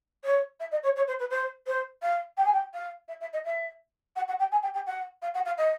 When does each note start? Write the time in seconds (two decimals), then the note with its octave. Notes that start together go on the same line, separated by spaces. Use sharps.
0.24 C#5
0.60 E5
0.71 D#5
0.83 C#5
0.96 C#5
1.08 C5
1.19 B4
1.30 C5
1.67 C5
2.02 F5
2.37 G5
2.45 G#5
2.53 G5
2.74 F5
3.08 E5
3.21 E5
3.33 D#5
3.44 E5
4.16 F#5
4.28 F#5
4.39 G5
4.52 G#5
4.63 G5
4.74 G5
4.86 F#5
5.22 F5
5.34 F#5
5.45 F5
5.58 D#5